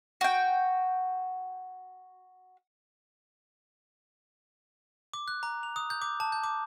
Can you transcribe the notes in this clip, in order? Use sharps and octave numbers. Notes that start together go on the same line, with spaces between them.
F#4 G5
D6
F#6
A#5
F7
D#6
G6
D6
A5
G6
D6